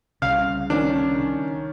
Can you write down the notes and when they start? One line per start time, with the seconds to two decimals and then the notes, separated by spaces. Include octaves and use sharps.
0.22 C2 C#3 F5
0.70 D#3 C#4 D4